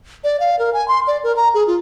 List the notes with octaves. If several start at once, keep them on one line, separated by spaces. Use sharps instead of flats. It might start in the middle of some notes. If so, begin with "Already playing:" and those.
D5
F5
A#4
G#5
C6
D5
A#4
A#5
G#4
F4